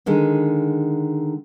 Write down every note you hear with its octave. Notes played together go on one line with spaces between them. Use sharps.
D3 D#3 G#3